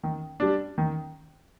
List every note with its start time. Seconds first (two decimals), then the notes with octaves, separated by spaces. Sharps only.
0.03 D#3
0.40 G3 D4
0.78 D#3